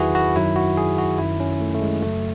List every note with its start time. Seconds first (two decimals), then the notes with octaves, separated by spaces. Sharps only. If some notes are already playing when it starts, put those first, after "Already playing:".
Already playing: E2 D#3 F#3 E4 F#4 G#4 B4
0.15 F#4
0.36 F#2 D#3 F#3 E4
0.56 F#4
0.77 G#4
0.98 F#4
1.18 F#2 D#3 F#3 E4
1.40 C#4
1.60 A3
1.75 A3
1.82 G#3
2.03 F#2 C#3 F#3 A3